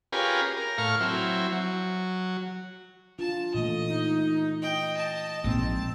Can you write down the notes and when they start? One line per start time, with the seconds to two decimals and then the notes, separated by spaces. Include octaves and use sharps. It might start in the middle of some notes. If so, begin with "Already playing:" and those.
0.12 C#4 F4 G4 G#4 A#4 B4
0.57 A#4
0.78 A2 F5 C#6 F6
1.00 F#3 C4 E4
1.52 F#3
3.19 D4 F4 A5
3.55 A#2 E3 A3 D#5
3.89 D#4
4.62 D#5 G5
4.96 A5
5.44 A#1 G#2 C4